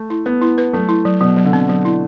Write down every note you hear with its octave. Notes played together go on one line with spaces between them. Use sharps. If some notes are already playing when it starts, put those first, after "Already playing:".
Already playing: A3
E4
B3 B4
E4
B4
F#3 A3
E4
F#3
B2 F#3
F#3
D3
C4
F#3
E4